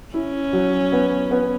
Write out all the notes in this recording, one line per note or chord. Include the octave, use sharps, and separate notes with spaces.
C#4 E4
F#3
B3
B3